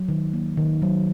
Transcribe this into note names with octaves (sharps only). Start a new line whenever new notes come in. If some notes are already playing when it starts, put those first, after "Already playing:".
Already playing: F#3
D#3
A#3
D#3
F#3